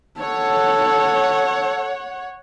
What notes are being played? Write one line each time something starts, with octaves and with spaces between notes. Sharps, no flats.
A4 C#5 F#5